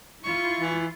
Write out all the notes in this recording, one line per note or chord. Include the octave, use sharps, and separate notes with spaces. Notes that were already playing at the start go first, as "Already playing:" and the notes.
E4 F4 C#6
E3